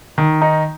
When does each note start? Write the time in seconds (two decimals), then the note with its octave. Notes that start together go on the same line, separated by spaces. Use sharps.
0.18 D#3
0.42 D#4